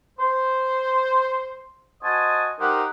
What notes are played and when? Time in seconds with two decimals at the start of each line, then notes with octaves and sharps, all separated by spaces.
0.19 C5
2.03 F#4 C5 D#5 G#5 A5
2.60 D#4 G4 A#4 C5 F#5